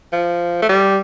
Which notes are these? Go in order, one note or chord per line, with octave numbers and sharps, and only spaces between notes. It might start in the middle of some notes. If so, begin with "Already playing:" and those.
F3
A3
G3